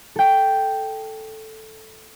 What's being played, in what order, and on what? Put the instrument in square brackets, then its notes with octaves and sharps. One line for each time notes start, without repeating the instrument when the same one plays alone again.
[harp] A4 G5